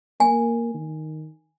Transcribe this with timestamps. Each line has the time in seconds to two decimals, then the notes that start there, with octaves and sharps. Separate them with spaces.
0.20 A#3 G#5
0.74 D#3